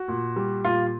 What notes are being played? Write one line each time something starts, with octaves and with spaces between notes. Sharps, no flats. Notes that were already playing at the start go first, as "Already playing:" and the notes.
Already playing: F#4
A#2
G3
A#2 F4